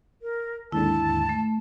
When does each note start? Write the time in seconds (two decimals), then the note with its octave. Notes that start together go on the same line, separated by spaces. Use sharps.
0.22 A#4
0.72 D#2 G#2 D3 E4 A5
1.29 A3